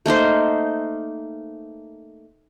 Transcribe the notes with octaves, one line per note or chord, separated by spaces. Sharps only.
A3 A#3 D#4 C5